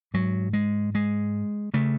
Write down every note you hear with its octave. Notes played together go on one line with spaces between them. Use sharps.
G#2 F#3
G#3
G#3
C#3 A3